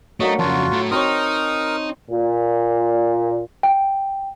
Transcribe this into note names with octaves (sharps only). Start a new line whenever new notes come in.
F#3 A3 A#3 D4 D#4 D#5
F2 C#3 F4 F#4 A5
A2 A3
C4 D#4 A#4 C#5 D#6
A#2
G5